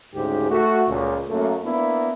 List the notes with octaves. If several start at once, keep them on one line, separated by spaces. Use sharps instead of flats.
D2 G#2 C#3 G4
A3 F#4
C#2 A#2
F#2 A3 A#3
A#3 B3 D4 E4